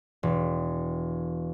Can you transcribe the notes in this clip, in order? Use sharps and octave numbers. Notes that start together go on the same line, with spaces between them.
E1